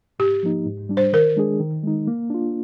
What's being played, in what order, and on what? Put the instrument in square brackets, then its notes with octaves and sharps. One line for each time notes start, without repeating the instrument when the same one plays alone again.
[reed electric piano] G#2 [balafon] G4
[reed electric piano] F3 A#3 D#4
G#2
G3 D4
[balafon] C5
[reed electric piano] D#3 [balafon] A#4
[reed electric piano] G#3 D4 G#4
D#3
G#3 D#4
A#3
D4 F4